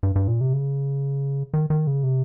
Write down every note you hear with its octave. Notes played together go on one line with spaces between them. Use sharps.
G2
G2
A#2
C3
C#3
D#3
D#3
C#3
C3